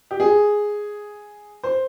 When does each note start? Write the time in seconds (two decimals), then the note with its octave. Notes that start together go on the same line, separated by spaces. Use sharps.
0.11 G4
0.20 G#4
1.63 C5